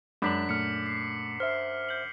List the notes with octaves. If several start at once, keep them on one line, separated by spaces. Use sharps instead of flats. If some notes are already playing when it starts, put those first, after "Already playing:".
F#2 G#3 D4 B5 D6 B6 F#7
A#2 A3 F6 C#7
C7
C5 E5 F6 C7
G6 F#7